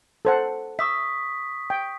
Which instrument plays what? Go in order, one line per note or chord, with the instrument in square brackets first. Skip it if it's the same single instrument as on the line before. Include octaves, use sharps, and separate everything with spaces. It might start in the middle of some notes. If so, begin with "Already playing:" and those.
[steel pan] A4 C5 F#5
[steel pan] E5 [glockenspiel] C#6 D#6 B6
[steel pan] G5